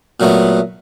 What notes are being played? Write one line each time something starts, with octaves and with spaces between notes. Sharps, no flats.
A#2 F#3 A3 B3